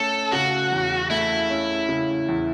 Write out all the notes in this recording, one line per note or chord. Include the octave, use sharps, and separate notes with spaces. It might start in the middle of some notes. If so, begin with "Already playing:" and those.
Already playing: A3 C#4 A4
C#3 F#4
E2
A3 E4
C#4
C#3
E2